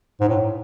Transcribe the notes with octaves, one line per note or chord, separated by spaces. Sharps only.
G#2
A2